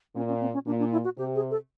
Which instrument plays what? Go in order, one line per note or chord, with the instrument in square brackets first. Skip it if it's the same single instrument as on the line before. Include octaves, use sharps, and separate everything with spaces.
[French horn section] A#2 [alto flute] C#4
[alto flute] C#4
C4
C#4
[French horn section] A#2 [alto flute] D4
[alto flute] D4
E4
F#4
[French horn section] C3 [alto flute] G4
[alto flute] G#4
A4